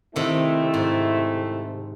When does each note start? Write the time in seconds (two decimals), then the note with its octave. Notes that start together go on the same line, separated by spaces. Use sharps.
0.16 C3 D#3 A3 C4 E4
0.74 G#2